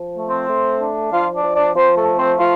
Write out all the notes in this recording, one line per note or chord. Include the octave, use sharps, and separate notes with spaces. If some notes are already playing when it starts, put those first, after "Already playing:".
Already playing: F3
A3
C4 C5
A3
D4
F3 F4 F5
D4 D5
F3
D4 D5
F3 C4 C5
A3 A4
A3
C4 C5
F3 F4 F5